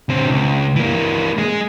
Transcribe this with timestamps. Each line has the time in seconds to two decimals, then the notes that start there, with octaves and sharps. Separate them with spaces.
0.09 D3 C4
0.29 C#2
0.76 E3 A#3
1.39 G#3 G#4